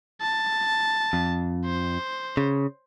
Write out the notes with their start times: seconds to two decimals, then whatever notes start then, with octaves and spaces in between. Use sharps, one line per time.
0.20 A5
1.13 F2
1.65 C5
2.37 C#3